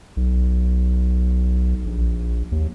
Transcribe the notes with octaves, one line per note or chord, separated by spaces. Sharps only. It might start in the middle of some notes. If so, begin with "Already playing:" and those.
B1
A#1
D#2